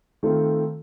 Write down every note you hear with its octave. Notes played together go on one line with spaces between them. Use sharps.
D#3 A3 C4 F4 A4